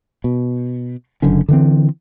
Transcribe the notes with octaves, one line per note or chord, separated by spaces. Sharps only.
B2
F#1 F#2 D3 C#4
D3 E3 C4